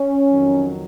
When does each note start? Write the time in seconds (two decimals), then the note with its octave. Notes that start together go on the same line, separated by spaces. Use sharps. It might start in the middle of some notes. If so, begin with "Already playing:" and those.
Already playing: C#4
0.30 F2 D#3 F#3